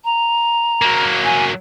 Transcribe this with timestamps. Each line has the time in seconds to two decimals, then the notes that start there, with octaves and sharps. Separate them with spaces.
0.05 A#5
0.82 F#3 A#3
1.24 G#5